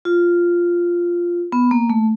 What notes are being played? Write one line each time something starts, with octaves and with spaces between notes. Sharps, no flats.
F4
B3
A#3
A3